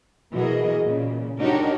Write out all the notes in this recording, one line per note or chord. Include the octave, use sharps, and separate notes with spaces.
B2 E3 F#4 G#4 A#4 D#5
A#2 C#3
D4 D#4 F#4 G4 A#4 C#5